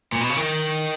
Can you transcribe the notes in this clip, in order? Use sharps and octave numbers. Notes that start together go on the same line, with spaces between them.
A#2
B2
C#3
D#3